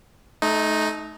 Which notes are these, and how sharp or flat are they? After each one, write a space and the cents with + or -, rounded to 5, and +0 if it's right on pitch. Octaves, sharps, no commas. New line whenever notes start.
A3 -30 D#4 +0